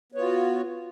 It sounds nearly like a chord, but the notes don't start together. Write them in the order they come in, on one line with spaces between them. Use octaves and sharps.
B3 C#5 F4 F#4